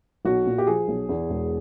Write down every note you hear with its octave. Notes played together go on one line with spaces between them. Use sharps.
B1 F#4
A#2
G4
F3 G#4
B1
E2
E1